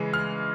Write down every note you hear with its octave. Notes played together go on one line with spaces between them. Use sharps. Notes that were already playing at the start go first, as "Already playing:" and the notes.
Already playing: C#3 E3 G#3
F6